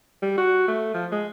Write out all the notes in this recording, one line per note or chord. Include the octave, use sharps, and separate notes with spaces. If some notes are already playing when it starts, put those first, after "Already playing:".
G3
F#4
A3
F3
G#3